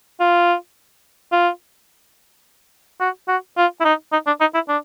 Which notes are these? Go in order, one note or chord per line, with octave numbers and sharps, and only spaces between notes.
F4
F4
F#4
F#4
F4
E4
D#4
D#4
D4
D#4
E4
D4